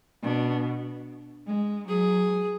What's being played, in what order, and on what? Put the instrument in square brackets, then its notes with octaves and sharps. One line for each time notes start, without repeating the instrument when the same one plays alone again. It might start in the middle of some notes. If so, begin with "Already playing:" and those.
[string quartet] B2 [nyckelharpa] D4
[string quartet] G#3
[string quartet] F#3 [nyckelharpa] G#4